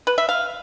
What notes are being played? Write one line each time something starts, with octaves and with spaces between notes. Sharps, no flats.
B4
E5
F5